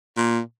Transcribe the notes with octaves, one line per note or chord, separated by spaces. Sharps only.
A#2